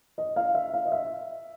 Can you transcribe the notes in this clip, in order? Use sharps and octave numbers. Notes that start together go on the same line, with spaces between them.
D#5
F5
E5
F5
D#5
E5